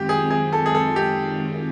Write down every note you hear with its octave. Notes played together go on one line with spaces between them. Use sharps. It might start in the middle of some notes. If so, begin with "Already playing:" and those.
Already playing: F#2 D#3 G#3 C4 F4 G4
G#4
G#4
A4
G#4
A4
G4